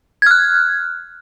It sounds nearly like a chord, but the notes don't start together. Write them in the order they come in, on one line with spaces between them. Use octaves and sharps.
G#6 F6 F#6